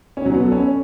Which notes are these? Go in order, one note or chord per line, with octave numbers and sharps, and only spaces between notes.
C#4
F#3
B3
A4
C#4